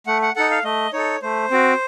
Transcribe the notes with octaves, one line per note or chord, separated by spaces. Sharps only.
A3 F#5
F#5
D#4 A4 F#5
F5
A3 D#5
D#4 A4 C#5
A3 C5
C4 F#4